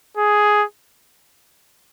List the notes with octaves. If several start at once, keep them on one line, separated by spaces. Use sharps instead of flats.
G#4